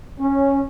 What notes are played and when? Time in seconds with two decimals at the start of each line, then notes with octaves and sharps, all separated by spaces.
0.20 C#4